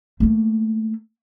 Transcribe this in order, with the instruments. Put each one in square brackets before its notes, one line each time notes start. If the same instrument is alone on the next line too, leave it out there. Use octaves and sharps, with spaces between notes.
[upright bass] A3 A#3